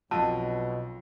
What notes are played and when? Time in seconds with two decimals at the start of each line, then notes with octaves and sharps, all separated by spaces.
0.11 B1 F2 B2 A5